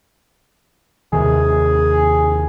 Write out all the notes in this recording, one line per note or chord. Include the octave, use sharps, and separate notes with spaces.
D#2 C3 D#3 G#4